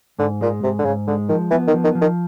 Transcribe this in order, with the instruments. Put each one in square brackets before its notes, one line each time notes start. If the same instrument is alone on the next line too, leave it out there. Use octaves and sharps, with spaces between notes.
[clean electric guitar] G#2 [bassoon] D3
[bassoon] A#2 [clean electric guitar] G#3
[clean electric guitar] G#2 [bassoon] C3
[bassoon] D3
[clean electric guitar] G#2 [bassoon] C#3
[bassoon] D3 [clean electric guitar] G#3
[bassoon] D#3 [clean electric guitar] F3
[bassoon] E3 [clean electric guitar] B3
[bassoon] D#3
[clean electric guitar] F3
[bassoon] D#3
[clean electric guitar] F3
[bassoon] D#3